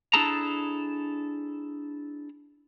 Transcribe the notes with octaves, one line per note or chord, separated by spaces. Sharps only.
D4 E4 G#4 A4 A5 A#5